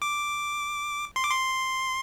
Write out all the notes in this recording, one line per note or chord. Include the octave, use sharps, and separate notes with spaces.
D6
C6
D6
C6